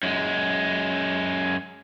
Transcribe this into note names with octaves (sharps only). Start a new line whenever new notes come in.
F#2 G#3